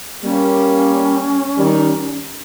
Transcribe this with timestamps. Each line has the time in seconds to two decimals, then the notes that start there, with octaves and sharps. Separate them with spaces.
0.24 G3 A#3 C#4
1.57 D#3 G3